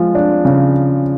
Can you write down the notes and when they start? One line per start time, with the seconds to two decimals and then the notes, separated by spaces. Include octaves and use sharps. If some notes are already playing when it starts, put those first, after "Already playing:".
Already playing: F3 G#3
0.15 D4
0.45 C#3